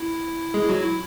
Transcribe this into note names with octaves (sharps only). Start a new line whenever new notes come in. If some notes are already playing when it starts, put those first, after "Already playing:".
Already playing: E4
G#3 G#4
E4
F#3 F#4
E4